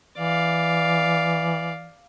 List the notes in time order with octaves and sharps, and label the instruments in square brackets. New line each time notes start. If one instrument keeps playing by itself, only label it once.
[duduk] E3 [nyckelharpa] D5 F5